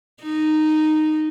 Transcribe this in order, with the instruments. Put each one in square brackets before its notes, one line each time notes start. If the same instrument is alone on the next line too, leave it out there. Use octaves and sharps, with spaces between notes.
[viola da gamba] D#4